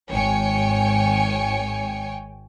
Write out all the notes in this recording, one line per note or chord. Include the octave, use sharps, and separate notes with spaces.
G#1 C#5 G5 G#5 C#7